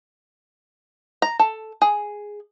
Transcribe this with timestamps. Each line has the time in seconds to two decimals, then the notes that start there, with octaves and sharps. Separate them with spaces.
1.22 A#5
1.39 A4
1.82 G#4